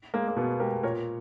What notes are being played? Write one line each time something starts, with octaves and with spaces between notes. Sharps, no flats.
G#3 A#3
A#3
B2 B3
G#3 G4 A#4
A#2 A#4 C#5